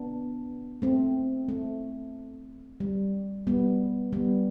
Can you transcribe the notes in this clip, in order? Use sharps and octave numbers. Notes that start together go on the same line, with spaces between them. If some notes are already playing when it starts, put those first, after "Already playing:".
Already playing: B3 D4
A3 C4
A3
G3
G3 B3
G3 B3